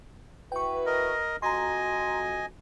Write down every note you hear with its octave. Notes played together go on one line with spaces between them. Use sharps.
E4 F#4 B4 G5 C#6
A#4 D#5
F2 F#4 D#5 G#5 A#5 C6